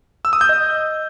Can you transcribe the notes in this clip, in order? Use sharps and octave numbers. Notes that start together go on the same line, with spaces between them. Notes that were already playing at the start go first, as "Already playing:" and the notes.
E6
D#6
G6
D#5